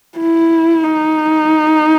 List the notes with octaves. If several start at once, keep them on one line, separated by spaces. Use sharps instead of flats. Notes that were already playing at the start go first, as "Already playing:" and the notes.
E4
D#4